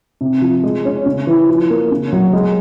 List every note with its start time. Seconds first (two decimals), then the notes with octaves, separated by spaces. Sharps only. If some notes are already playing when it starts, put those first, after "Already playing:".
0.21 C3
0.42 F3
0.63 G#3
0.85 C#4
1.06 C#3
1.27 E3
1.49 F3
1.70 A#3
1.91 C#3
2.13 F#3
2.33 G#3